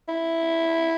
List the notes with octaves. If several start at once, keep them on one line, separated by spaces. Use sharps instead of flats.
E4